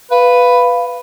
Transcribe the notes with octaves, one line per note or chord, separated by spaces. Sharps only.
B4 F5